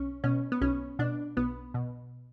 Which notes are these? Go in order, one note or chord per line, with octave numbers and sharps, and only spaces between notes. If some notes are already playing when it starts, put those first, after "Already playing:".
Already playing: B1 C#4
B2 C#4
B3
B1 C#4
B2 D4
B1 B3
B2